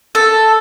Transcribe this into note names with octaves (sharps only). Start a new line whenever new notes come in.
A4